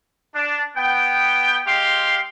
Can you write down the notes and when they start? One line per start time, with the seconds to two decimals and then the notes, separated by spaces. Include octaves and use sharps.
0.34 D4
0.76 B3 G5
1.66 G#3 G4 F5 G5 C6